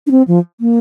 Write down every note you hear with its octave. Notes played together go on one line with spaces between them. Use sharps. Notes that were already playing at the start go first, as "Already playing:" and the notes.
D4
C4
F3
A#3